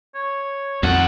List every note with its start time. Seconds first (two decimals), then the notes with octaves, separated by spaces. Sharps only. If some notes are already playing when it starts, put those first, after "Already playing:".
0.15 C#5
0.83 F2 D#3 A4 F#5